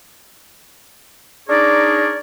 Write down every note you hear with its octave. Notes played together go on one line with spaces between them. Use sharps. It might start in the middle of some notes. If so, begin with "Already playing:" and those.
D4 D#4 G#4 A#4 C#5 D5